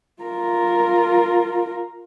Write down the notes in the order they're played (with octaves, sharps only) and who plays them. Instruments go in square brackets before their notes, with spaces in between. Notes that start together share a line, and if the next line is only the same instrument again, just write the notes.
[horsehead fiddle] F4 A#4